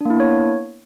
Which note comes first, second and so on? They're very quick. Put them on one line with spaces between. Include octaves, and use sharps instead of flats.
D4 A#3 E4 B3 C#5